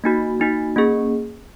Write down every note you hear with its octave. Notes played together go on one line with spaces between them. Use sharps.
A#3 D#4 F#4
A#3 D#4 F#4
A#3 C#4 G#4